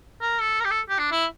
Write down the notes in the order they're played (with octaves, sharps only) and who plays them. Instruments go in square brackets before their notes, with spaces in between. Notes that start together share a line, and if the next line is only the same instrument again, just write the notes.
[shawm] A#4
A4
A#4
G4
A4
G4
D4
E4